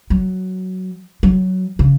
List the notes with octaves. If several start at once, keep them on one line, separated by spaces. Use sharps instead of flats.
F#3
F#3
C#3